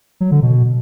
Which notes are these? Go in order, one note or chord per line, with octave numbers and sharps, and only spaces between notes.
F#3
D3
B2